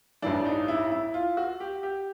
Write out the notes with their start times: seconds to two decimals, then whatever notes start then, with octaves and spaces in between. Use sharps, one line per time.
0.22 A1 G2 E3 D4
0.46 D#4
0.68 E4
0.91 E4
1.14 F4
1.37 F#4
1.60 G4
1.83 G4